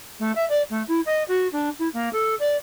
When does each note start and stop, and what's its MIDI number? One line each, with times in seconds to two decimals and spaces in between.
0.19 0.32 57
0.35 0.45 76
0.49 0.62 74
0.70 0.83 57
0.88 1.00 64
1.06 1.23 75
1.28 1.48 66
1.52 1.69 62
1.79 1.88 64
1.93 2.09 58
2.13 2.35 69
2.39 2.56 74